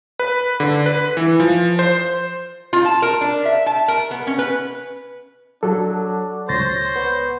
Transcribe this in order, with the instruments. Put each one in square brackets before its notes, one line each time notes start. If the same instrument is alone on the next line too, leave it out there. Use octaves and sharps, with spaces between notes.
[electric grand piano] B4
D3
B4
E3
F3
C5
[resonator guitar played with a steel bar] F4
A5
A#4
D4
E5
A5
A#4
B3
C#4
B4
[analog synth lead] F#3 [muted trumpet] D4 [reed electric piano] F#4 A4
[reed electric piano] C#2 A6 [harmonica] C5 [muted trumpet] C#5 [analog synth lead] A#6
[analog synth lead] B3